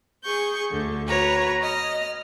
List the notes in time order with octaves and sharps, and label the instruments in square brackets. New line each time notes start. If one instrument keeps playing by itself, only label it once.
[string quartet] G#4 C#6 G6
D2 D3
F#4 B4 C#5 A#5
D#5 F6